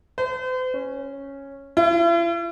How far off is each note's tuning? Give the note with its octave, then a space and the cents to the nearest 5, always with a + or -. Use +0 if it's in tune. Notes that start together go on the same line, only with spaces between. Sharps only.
C5 -40
C#4 -5
E4 +45